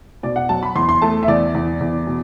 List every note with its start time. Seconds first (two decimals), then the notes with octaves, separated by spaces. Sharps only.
0.23 B2 D5
0.36 F#5
0.49 F#3 A5
0.63 B5
0.75 E2 C6
0.89 C6
1.02 A3 A5
1.23 E5
1.28 E2 D5
1.55 E2
1.80 E2
2.07 B2